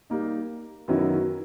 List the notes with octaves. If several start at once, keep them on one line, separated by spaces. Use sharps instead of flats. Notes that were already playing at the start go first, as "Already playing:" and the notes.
G3 A#3 D#4
F#2 D#3 F#3 B3 E4